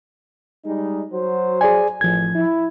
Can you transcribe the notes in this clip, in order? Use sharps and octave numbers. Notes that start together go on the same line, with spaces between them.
G3 G#3 D#4
F#3 F#4 C5
G#4 D5 G#5
A1 F3 G#6
E4